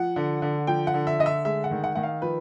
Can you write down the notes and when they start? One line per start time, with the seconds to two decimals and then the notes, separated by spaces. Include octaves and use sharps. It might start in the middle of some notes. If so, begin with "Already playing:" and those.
Already playing: F3 F#5
0.16 D3
0.42 D3
0.67 F3 G5
0.87 F#5
0.94 D3
1.07 E5
1.19 D3 D#5
1.26 E5
1.45 G#3 E5
1.64 F#5
1.71 D#3
1.84 F#5
1.95 D#3 F#5
2.03 F5
2.22 F3 B4